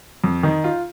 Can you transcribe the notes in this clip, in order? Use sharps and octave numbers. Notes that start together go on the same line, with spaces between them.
F2
D#3
F4